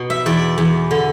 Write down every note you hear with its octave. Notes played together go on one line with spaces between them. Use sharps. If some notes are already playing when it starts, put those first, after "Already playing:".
Already playing: B2
E5
E2 D5
E2
D3